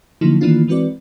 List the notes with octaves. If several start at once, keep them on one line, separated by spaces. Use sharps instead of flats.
D3 F3 F#3 A#3 D#4 E4
D#3 E3 A#3 B3 D4 F4
E3 G#3 C4 F#4 B4 D5